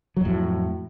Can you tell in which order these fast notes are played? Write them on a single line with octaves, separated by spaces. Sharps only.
F#3 F2 A2